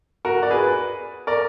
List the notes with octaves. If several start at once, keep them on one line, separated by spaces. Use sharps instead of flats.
F#4 A#4
D5
G#4 B4
A#4 D5